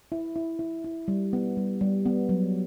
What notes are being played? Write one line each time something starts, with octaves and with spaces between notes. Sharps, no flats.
E4
E4
E4
E4
G3
B3
G3
G3
B3
F#3